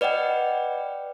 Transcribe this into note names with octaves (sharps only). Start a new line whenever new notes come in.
B4 D5 D#5 F#5 G5